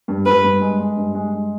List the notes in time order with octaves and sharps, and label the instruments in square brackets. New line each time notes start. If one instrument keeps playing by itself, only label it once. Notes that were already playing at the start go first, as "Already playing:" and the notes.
[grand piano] G2
[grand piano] G2 [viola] B4
[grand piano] G2
G#3
G#3
G2
G#3
G#3